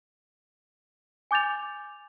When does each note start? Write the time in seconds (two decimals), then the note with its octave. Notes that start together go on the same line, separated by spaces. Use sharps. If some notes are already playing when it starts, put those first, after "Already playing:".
1.31 G#5 D6 G6 A6 F7